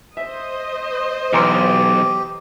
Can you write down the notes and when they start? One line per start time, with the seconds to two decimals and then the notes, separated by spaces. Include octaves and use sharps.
0.17 C5 D#5 E5
1.33 B1 E3 G4 A#5 C6